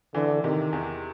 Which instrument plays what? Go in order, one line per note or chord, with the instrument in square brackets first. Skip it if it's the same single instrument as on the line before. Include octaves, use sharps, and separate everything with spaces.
[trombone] D3 [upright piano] E3
[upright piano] C3 [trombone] D#3
[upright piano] E2